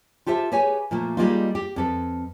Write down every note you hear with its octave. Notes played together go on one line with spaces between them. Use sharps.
F4 G4 A4 C5 E5
G4 G#4 B4 C#5 G#5
A#2 F3 A3 A#3
G3 G#3 A#3 D#4 F4
G4
F2 A4 B4